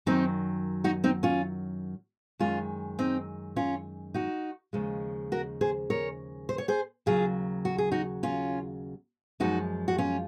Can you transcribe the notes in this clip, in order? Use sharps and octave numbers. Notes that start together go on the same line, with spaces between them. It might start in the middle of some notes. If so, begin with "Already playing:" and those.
F#2 D#3 F#3 C4 D#4
D#4 F#4
C4 D#4
C#4 F4
F#2 D#3 G#3 C#4 F4
C4 D#4
C#4 F4
D#4 F#4
D#2 C#3 F3 G#3
F#4 A#4
G#4 C5
A#4 C#5
C5
C#5
G#4 C5
D#2 C#3 F#3 F4 G#4
F#4
G#4
D#4 F#4
C#4 F4
F#2 F3 G#3 D#4 F#4
F#4
C#4 F4